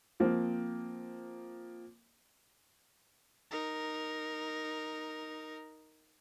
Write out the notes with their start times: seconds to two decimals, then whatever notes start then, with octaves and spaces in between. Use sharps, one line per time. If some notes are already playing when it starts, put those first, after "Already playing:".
0.20 F3 A#3 C4
3.51 D#4 A#4